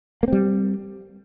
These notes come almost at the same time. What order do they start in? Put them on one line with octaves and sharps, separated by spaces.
A#3 C4 G3